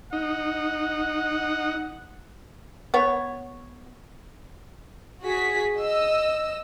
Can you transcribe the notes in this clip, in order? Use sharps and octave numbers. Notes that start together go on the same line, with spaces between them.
D#4 F#5
B3 C#5
F#4 G#4 B6
D#5 E6